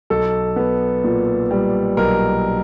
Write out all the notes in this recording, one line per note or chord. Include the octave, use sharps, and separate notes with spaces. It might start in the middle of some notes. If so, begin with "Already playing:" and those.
B1 A4
B3
A#2
G3
B1 A#4